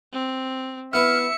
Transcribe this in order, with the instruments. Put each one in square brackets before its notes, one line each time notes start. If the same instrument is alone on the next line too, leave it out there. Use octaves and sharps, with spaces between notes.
[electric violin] C4
[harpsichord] B3 E4 B4 [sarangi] E5 [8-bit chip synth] F6 [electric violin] C#7